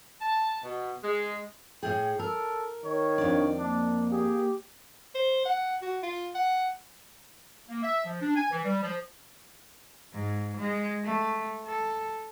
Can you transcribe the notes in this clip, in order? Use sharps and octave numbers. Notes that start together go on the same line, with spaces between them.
A5
B2
G#3
A2 G#4 G5
A4 A#4
D#3 C#5
F2 D4 D5
A#3 D4
G4 G#4
C5
F#5
F#4
F4
F#5
A#3
E5
F3
D4
G#5
E3
G3
F3
G#2
G#3
A3
A4